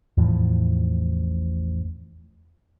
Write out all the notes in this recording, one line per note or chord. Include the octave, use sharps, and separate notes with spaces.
A1 E2 A2 F3